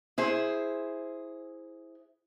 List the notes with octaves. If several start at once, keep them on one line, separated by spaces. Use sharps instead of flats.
E4 G#4 C5